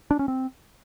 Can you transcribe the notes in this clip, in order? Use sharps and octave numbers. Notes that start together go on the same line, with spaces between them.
D4
C#4
C4